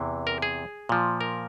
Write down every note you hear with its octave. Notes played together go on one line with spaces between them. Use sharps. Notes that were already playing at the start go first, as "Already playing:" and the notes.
Already playing: E2 C3 E3
A#4
G#4
A#2 F3
A#4